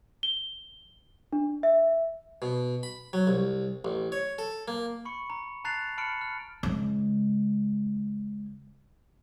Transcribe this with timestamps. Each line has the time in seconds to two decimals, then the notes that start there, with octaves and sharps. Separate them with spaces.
0.23 G7
1.33 D4
1.63 E5
2.42 B2
2.83 B5
3.13 F#3
3.27 C2
3.85 A1
4.12 C#5
4.39 A4
4.68 A#3
5.05 B5 C#6 C#7
5.30 A#5
5.64 A5 A#5 F#6 A6 C7 F7
5.98 A5 B5 F6 C#7 D7
6.21 F6
6.63 C#3 G#3